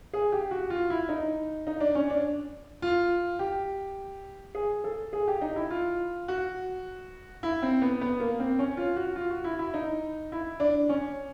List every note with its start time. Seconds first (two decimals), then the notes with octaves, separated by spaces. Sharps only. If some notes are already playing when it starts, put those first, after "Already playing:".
0.13 G#4
0.32 G4
0.51 F#4
0.70 F4
0.90 E4
1.09 D#4
1.67 D#4
1.80 D4
1.95 C#4
2.10 D4
2.82 F4
3.39 G4
4.55 G#4
4.84 A4
5.13 G#4
5.28 G4
5.41 D#4
5.56 E4
5.71 F4
6.28 F#4
7.43 E4
7.62 C4
7.82 B3
8.01 B3
8.20 A#3
8.40 C4
8.59 C#4
8.77 F4
8.96 F#4
9.16 F4
9.30 F#4
9.44 E4
9.59 E4
9.74 D#4
10.32 E4
10.60 D4
10.89 C#4